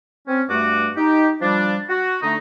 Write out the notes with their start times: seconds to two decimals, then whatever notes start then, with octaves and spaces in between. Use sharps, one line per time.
0.28 C4 C#4
0.49 G2 A3 F#4 D6
0.97 D#4 G4
1.42 F3 G3 D4
1.89 F#4
2.22 D3 A3 D#4